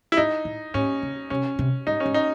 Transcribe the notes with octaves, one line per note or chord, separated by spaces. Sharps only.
E4
G#2 D#4
A2
A2 C#4
C#3
C3 C#4
C3
G#2 D#4
C#4
G#2
D#4